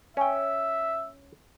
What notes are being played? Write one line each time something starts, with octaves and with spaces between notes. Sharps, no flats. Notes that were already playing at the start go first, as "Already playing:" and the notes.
C#4 E5 G5